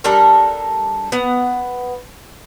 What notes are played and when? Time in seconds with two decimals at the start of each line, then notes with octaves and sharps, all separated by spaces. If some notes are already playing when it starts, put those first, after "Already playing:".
0.04 G3 D4 A4 A#4
1.12 B3 F#5